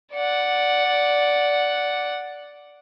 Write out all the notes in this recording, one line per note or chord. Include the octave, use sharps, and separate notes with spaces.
D5 F#5